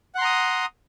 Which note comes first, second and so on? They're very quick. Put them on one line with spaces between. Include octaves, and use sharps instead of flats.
F#5 C6 A#5 D#6